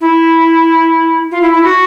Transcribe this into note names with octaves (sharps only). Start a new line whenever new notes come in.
E4
F4
E4
E4
F#4